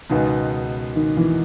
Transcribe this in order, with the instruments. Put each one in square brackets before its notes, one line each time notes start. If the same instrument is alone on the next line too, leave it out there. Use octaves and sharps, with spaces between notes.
[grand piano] C#2 B2 G#3 B3 [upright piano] D#3
[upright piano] D#3
E3